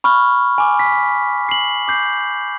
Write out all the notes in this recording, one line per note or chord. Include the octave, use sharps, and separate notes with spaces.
B5 C#6 F6
G#5 D6
B6
C7 F#7
D6 G6 C7